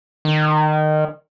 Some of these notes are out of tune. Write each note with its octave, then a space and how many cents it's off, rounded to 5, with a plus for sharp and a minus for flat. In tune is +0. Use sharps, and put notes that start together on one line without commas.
D#3 -20